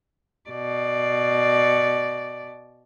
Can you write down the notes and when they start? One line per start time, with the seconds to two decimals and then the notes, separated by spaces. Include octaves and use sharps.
0.49 B2 D5